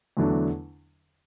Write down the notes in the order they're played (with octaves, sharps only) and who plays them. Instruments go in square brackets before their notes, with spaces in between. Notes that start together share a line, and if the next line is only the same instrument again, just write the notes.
[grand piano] E2 D3 F#3 A3 D4